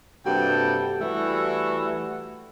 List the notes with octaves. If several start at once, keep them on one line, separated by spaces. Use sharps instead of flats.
G2 C3 A#3 F#4 A4 G5
E3 G3 A3 E4 F#4